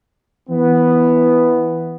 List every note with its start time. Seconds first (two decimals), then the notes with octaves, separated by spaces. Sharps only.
0.49 E3 B3